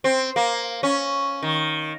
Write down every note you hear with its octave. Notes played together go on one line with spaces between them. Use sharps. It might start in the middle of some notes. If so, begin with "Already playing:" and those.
C4
A#3
C#4
D#3